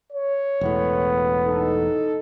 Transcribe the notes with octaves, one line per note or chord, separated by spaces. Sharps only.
C#5
E1 A2 B3
D#4 A4